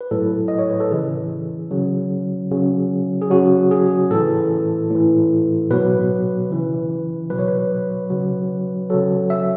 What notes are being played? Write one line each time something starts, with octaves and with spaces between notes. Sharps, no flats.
B4
A2 F#3 A4
D#5
C#5
B4
A4
C#3 E3 G#4
C#3 F#3
C#3 F#3
G#4
C#3 F#3 F#4
G#4
A2 E3 A4
A2 E3
B2 F#3 B4
C#3 E3
B2 F#3 B4
C#5
B4
C#3 F#3
C#3 F#3 A4
E5